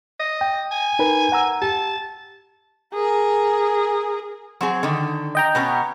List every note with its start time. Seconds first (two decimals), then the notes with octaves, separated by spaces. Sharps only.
0.19 D#5
0.41 G5
0.71 G#5
0.99 D#4 A#4 B4
1.32 F#5 A#5 E6
1.62 G4 A5
2.94 G#4 A#4
4.61 F#3 C4 G#4
4.83 D3 D#3
5.35 D#5 G5 A#5
5.55 B2 B3 C#4